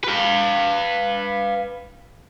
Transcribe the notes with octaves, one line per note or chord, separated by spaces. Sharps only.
B4 F5